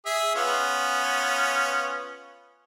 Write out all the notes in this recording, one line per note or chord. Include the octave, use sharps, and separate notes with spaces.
G#4 E5
B3 C#4 F4